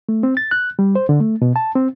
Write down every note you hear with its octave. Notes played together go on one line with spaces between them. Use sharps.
A3
C4
A6
F#6
G3
C5
D3
A3
B2
A5
C4